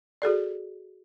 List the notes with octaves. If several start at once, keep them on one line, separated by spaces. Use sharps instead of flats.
F#4 G#4 A4 D5